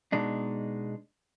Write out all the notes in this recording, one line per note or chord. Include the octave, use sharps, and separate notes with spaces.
B2 G#3 D4 D#4